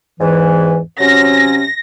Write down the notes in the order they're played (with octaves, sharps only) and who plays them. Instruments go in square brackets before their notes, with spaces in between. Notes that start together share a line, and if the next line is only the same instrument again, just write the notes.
[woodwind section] E2 G#2 E3
[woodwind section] C3 F#3 C#4 [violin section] A#6